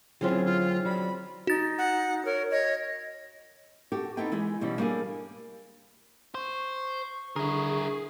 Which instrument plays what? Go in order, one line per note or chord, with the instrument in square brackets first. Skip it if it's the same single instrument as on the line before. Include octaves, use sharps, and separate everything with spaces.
[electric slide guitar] D3 F#3 E4 [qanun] C4 C#4 G#4 [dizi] F4
[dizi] F4
[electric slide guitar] F#3 D5 [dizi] B5
[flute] D#4 [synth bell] F#4 A6
[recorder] F#5
[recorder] A#4 [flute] C#5
[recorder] C#5 [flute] D#5
[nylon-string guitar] F#4 G4 A4
B3 C4 D#4 E4 A4 G5
E3 G#3 G#4
B2 E3 G3 C#4
G3 A#3 D4 G#4 A4
[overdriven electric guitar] C5 [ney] C#6
[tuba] D3 [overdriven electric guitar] E4 A#4 [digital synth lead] G#4